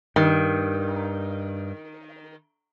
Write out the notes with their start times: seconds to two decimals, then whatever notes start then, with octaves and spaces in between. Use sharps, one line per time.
0.16 G2 D#3